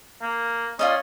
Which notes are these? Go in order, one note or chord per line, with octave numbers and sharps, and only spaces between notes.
A#3
C#4 F4 D5 D#5